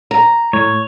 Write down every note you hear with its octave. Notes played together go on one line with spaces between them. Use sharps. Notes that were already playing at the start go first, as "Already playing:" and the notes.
A#5
A2 C#5